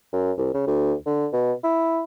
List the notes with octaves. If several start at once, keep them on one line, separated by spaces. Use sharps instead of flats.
F#2
C2
C#3
D2
D3
B2
E4